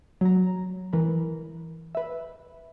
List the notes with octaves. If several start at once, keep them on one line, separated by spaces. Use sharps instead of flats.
F#3 A#5
E3 A#4 B5
B4 E5